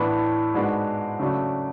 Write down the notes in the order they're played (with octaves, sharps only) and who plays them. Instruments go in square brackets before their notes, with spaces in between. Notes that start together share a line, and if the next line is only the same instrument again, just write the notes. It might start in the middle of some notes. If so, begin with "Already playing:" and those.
Already playing: [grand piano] A2 E3 B3 D4
G#2 G#3 B3 D4 F#4
C#3 F#3 A3 D4 F#4